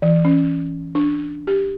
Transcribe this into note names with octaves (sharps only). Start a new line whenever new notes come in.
E3
C#4
D4
G4